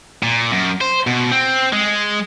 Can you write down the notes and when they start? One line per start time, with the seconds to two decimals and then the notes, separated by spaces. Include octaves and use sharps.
0.23 A#2
0.52 F#2
0.81 C5
1.07 B2
1.31 C4
1.73 G#3